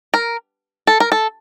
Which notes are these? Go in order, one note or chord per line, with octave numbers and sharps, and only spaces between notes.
A#4
A4
A#4
A4